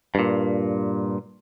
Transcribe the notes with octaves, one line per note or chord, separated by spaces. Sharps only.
G2 A#2